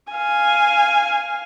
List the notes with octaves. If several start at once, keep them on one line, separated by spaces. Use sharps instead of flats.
F5 G#5